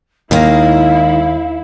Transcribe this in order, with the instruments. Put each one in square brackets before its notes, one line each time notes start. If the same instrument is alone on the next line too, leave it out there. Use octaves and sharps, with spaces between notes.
[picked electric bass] D#2 [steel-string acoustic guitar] D#3 G#3 A#3 [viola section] E4 [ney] F5